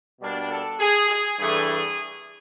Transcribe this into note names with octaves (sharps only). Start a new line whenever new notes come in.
B2 G3 A#3 D4
A4
G#4
G#4
G2 E3 A3 D4 G#4